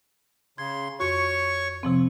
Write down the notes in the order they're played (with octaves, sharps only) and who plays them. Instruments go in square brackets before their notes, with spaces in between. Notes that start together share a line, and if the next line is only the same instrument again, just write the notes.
[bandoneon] C#3 C6 [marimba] G#6
[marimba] F2 F#4 [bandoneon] C#5 C#6
[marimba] C3 F3 C4